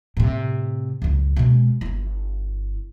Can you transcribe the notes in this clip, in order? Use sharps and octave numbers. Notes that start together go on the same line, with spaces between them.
A2 C3
C#2 F#2
B2 G#3
G1 E4